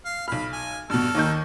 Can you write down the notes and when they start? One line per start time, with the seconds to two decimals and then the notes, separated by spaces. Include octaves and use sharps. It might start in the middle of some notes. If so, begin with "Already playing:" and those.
0.05 F5
0.28 B1 B5 F6
0.52 G#5
0.90 G2 B2 A4 F6
1.15 D#2 D#3 G6